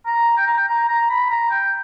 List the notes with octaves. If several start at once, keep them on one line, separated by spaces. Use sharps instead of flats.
A#5
G5
A#5
G5
A#5
A#5
B5
A#5
G5